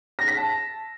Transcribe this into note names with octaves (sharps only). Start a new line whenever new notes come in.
A#6
B6
A5